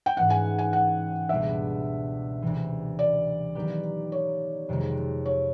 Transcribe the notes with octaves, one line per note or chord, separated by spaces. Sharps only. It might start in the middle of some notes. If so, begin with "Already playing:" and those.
G5
G#2 E3 A3 C#4 F#5
G#5
G#5
F#5
C#2 B2 G3 B3 D4 E5
D2 C3 E3
D5
D#3 F#3 B3 D#4 G4
C#5
F2 C3 D#3 G#3
C#5